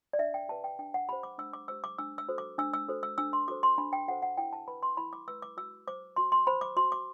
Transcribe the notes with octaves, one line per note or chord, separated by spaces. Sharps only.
D5
D4 E5
G5
G4 B4 A5
G5
D4 G5
F#5
G4 C5 B5
D6
D4 E6
D6
G4 C5 E6
D6
D4 E6
E6
F#4 A4 C5
D6
D4 E6
E6
F#4 A4 C5
E6
D4 E6
C6
F#4 A4 C5 D6
C6
D4 B5
G5
F#4 A4 C5 F#5
F#5
E4 G5
A5
B4 B5
C6
E4 B5
D6
B4 E6
D6
F#4 E6
C5 D6
F#4 C6
C6
C5 B5
D6
F#4 C6
D6